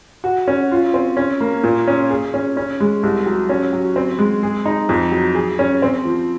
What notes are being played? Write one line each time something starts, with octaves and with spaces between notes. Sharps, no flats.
F#4
C#4
F4
C4
C#4
A#3
A#2
C#4
G#4
C#4
C#4
G#3
C2
F#3
C#4
F#3
C4
G#3
G#4
D#4
F2
F#3
G#4
C#4
C4
F3